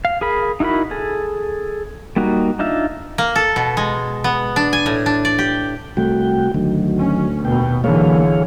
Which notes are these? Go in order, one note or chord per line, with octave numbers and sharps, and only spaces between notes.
F5
G#4 A#4 B5
D#4 E4 F#4 A#4 B5
G#4 A4
G3 A#3 D#4 F#4
D4 D#4 F4 E5
A#3
A4
B2
G#3
B3
D4
G#5
A2
D4
D5
G4
C2 A3 F#4 G5
D2 D#3 F#3
C#4
D#2 B2 G5
B1 D3 E3 A#3 G#4 C#5 F5